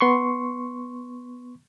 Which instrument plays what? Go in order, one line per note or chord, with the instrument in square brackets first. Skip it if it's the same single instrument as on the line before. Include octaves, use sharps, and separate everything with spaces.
[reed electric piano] B3 C6 C#6